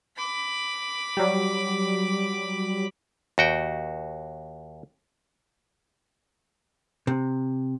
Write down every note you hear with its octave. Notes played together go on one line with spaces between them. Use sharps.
B5 D6
F#3 G3
D#2 F#4 G5
C3